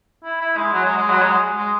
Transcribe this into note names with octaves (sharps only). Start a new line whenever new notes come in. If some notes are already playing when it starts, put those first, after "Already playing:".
E4
E4
G#3
F#3
G#3
G#3
F#3
G#3
G#3